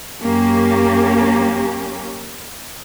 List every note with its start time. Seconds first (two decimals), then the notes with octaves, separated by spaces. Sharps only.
0.22 F#2 A#3 C#4 G4